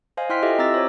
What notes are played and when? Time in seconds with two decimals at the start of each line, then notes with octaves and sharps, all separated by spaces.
0.17 C5 D#5 F5 G#5
0.30 E4 G5 C6 F6 B6
0.42 E4 F4 G4 A4 D#5 E5
0.58 C4 A#5 D6 E6 A6 A#6
0.74 C5 C#5